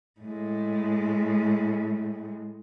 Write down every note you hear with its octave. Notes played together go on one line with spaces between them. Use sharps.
A2 G#3